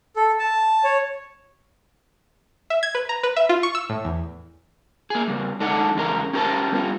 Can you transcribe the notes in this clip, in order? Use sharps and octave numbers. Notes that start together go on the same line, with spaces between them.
A4
A5
C#5
E5
G#6
B4
A#5
B4
E5
F4
C#6
E6
A2
E2
A#3 G#4
C#3 G3
G#3 D4 D#4 A4 D5 F#5
E2 C#3 G#3 A#4
C#4 G4 A#4 C5 A5
G3 B3 F4